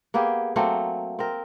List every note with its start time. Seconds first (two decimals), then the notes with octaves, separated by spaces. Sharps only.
0.14 A#3 B3 G4 G#4
0.56 F#3 A3 A#3 C4
1.19 C4 A#4